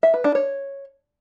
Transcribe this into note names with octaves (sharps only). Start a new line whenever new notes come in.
E5
B4
D4
C#5